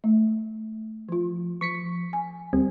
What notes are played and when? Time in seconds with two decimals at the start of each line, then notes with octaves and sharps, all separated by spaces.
0.04 A3
1.09 F3 F4
1.61 F3 C#6 B6 C#7
2.13 G#5
2.53 D2 G3 C4